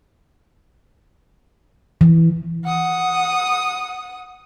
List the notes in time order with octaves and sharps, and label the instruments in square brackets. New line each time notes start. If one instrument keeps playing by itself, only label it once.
[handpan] E3
[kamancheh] F#5 D#6